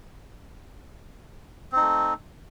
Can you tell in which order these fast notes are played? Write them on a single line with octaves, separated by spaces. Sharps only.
C4 D#4 A3